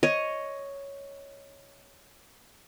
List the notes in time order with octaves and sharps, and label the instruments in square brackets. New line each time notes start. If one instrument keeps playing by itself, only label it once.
[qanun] C#5 D#5